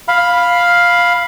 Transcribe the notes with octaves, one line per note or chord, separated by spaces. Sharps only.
F5 B5